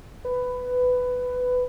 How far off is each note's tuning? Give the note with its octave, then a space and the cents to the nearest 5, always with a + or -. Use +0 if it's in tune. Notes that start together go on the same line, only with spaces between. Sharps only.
B4 +15